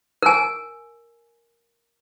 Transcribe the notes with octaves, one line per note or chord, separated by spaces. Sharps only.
A#4 G#5